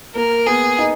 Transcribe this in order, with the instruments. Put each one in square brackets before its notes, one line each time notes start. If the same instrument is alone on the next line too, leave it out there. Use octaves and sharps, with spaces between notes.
[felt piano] A#3 [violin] A#4
[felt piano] B3 [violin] G#4
[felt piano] D#4